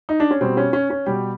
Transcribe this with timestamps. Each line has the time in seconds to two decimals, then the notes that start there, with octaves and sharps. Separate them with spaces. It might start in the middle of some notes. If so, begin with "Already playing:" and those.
0.09 D#4
0.20 D4
0.31 C#4
0.41 B2 G3 C4
0.57 C#4
0.73 C#4
0.90 C#4
1.06 B2 G3 G4